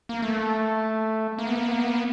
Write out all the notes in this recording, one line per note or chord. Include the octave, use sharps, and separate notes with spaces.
A#3
A3
A#3
B3
A#3
B3
A#3
B3
A#3
B3